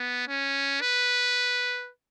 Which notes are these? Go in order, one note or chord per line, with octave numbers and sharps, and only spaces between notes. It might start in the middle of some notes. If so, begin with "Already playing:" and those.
Already playing: B3
C#4
B4